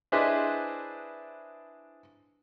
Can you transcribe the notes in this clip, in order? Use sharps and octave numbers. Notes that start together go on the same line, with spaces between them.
D4 E4 G#4 B4 C5 D#5